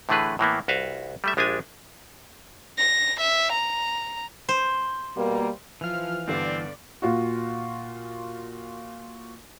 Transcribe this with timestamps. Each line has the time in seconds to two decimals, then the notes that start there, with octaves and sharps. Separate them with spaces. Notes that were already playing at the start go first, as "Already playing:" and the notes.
0.09 A2 D3 E3 A3 G#4 B4
0.39 A2 E3 A#3 B3
0.68 C2 F#4 B4 E5 F5
1.24 G3 A3 E5
1.37 A#1 G#3 D4 F4 G4 G#5
2.78 A#6
3.20 E5
3.52 A#5
4.49 C5
5.17 B2 G3 A#3
5.81 E3 F3 F5 F6
6.28 G2 D3 B3 C4 D5
7.02 A#2 F4 F#4